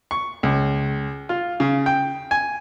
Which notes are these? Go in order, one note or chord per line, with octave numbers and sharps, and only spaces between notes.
C#6
C#2
F4
C#3
G5
G#5